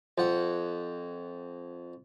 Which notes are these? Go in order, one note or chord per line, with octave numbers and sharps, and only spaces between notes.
F2 F#5